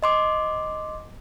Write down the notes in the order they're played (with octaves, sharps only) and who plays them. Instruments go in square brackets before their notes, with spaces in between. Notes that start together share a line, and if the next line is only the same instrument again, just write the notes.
[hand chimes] D#5 C6 D6